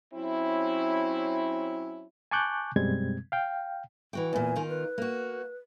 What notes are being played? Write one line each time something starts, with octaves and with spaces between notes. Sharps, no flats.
F#3 C4 C#4 E4
G#5 A5 C#6 D6 F#6 G6
F#2 B2 G3 G#3 C4 G#6
F5 G5
E3 F#4 G5
E2 A#2 G#5
D#3 F4
B4
A#3 F#4